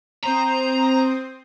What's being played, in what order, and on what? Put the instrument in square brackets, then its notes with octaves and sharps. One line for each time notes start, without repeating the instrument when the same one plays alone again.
[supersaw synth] C4 C5 D#6 [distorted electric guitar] A#5